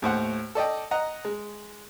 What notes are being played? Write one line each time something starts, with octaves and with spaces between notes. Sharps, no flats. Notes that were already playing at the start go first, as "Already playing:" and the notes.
D#2 A2 C5 F#5
A4 D5 D#5 G5
D#5 F#5 A#5
G#3